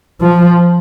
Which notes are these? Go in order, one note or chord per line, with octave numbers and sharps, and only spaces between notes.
F3